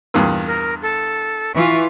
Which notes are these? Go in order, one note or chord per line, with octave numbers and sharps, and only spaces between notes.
E2 G2 A#2
A#4
A4
E3 F4 C#6